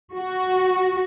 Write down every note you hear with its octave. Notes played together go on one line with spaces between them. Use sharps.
F#4